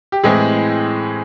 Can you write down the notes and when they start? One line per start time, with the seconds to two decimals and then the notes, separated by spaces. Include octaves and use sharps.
0.12 G4
0.24 A2 E3 G#3 C4 G#4